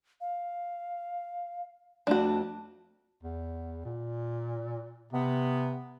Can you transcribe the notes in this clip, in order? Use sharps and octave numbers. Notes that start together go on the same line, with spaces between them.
F5
F2 A3 D4 F#4 A5
E2
A#2
C3 B3